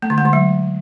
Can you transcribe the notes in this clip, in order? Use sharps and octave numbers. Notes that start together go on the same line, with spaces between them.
A3
D3
G#3
D3
F#3